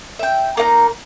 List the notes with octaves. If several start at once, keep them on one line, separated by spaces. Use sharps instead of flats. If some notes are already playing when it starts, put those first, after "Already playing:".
E5 G5
A#3 D#4 F#5 A#5